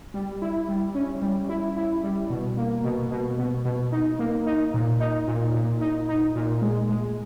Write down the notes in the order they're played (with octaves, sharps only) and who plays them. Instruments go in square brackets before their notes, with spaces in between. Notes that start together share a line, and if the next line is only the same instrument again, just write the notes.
[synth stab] G3
E4
G3
C#4
G3
E4
E4
G3
B2
A#3
B2
B2
B2
B2
D#4
A#3
D#4
A#2
D#4
A#2
A#2
D#4
D#4
A#2
G#3
G#3